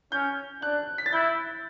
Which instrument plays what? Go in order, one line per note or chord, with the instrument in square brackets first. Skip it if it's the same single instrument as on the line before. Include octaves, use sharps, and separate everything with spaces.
[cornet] C#4 [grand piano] G6
[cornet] D4 [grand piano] F#6
[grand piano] B6
A6
[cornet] E4 [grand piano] G6